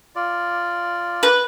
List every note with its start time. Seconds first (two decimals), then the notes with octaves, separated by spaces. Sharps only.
0.15 F4 D5
1.23 B4